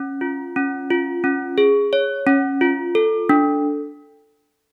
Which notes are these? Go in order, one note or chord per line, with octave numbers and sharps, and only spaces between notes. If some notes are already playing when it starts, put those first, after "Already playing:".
Already playing: C#4
F4
C#4
F4
C#4
G#4
C#5
C#4
F4
A4
D4